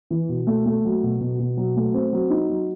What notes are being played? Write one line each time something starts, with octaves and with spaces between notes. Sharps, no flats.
E3
B2
A3
A3
F#3
B2
B2
B2
F#3
A3
C4
F#3
D#4
F#3